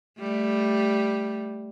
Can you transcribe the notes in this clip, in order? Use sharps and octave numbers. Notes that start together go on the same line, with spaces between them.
G3 A3